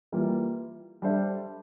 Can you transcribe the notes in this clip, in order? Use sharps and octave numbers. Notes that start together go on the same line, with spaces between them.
E3 G3 A#3 F4
G3 D4 A4 C5 E5